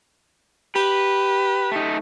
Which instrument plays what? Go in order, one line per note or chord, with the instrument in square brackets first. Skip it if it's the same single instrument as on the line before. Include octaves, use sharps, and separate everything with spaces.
[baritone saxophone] G4 [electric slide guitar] B4
[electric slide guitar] A3 D#4